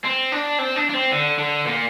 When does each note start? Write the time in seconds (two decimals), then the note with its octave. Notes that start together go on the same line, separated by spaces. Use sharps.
0.04 C4
0.32 D4
0.59 C4
0.76 D4
0.90 D4
0.94 C4
1.12 D3
1.39 D3
1.66 A#2